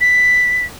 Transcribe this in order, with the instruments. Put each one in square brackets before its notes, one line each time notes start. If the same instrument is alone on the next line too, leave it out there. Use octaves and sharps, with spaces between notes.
[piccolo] B6